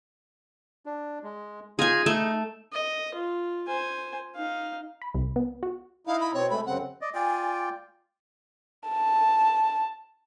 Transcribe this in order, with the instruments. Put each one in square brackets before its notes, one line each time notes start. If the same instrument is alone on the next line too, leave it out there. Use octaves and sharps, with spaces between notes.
[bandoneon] D4
G#3
[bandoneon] D#4 F4 A#5 [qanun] G#4 G#5
[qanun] A3 [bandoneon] D#4
[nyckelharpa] D#5
F4
C5 G#5
D#4 F5
[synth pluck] B5
C2
B3
F#4
[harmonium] D#4 E4 [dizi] F5
[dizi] B5
[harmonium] B2 C4 [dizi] C#5
[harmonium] G#3 A3 [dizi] B5
[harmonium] F#2 C#3 C4 [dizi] F#5
[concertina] D5 D#5
[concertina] F4 D5 G5 [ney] G#5
[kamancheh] A5